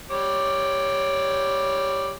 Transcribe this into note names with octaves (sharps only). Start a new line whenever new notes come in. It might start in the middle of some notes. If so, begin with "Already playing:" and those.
G3 C#5 D6